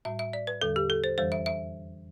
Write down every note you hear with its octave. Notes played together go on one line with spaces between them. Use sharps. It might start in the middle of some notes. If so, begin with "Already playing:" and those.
A2 G3 E5
E5
D5
B4
E2 D3 G3 A4
G4
A4
C5
F2 E3 G3 C5
E5
E5